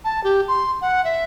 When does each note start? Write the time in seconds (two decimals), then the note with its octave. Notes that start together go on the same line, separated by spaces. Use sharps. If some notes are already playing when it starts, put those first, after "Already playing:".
0.05 A5
0.24 G4
0.48 C6
0.81 F#5
1.05 E5